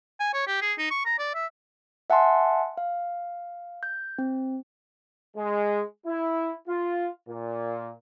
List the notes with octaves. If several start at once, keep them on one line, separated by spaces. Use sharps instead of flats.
G#5
C#5
G4
G#4
D#4
C#6
A#5
D5
E5
E5 F#5 G#5 A5 C6
F5
G6
C4
G#3
E4
F4
A#2